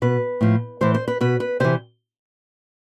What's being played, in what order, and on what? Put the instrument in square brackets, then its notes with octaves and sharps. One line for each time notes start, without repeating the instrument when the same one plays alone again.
[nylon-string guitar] B2 B4
A2 F3
A2 E3 C5
C5
B4
B2 B4
B4
C3 E3 C5